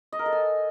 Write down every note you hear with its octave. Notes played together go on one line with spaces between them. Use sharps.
D#5
A#4
A4
G#5